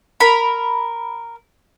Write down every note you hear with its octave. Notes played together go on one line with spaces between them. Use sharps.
A#4 B5